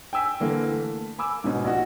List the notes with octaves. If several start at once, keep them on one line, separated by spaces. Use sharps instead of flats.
G5 G#5 E6 B6
D3 E3 A#3 A4
A3
G#5 B5 D6 E6
G#2 B2 C#4
A#1 D#4 F#4